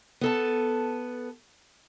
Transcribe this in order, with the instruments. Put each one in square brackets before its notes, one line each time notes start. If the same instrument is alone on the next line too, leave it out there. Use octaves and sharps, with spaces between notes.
[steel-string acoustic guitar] B3 A4 A5